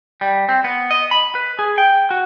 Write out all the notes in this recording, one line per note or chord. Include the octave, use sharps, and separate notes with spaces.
G3
C4
B3
D#5
B5
B4
G#4
G5
F#4